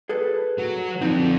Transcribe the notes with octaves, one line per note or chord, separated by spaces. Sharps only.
G#4 A4 B4
F#3
D3 F3 C4 D#4